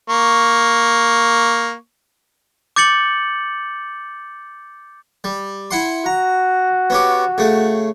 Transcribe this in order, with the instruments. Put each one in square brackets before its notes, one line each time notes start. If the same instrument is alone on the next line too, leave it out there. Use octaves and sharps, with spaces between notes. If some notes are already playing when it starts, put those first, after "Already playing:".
[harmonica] A#3 C#6
[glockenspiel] D6 G6 A6 C#7 F#7
[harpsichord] G3
E4 F#5 C6
[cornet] F#4 [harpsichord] A#5
[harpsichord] B3 C#4 G4
C#3 A3